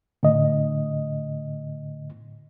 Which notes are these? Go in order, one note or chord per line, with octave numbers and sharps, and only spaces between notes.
A2 D3 D#5